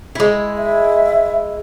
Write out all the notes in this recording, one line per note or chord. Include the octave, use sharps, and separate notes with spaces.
G#3 E4
E5